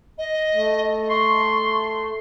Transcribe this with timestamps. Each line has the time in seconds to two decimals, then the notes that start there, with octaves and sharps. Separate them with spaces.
0.18 D#5
0.54 A3
1.10 C6 C#6